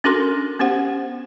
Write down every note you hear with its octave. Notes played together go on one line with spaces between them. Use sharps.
C#4 D4 F#4 A4 A#4 C6
B3 C#4 G4 C5 F#5